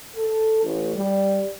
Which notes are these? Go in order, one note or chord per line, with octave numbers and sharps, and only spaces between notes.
A4
A1
G3